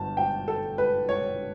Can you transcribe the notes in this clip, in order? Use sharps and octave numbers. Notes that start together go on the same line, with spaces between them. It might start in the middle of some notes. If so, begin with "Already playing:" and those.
Already playing: G1 A5
G5
A4
B4
C#5